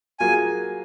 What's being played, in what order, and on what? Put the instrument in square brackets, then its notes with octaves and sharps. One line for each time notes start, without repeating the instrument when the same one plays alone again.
[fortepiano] F#3 A#3 F4 G#4 [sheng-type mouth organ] G#5